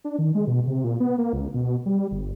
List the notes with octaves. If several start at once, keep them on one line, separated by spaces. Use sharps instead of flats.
D4
D#3
G#3
B2
C3
A#2
B3
A#3
C#2
B2
G3
G1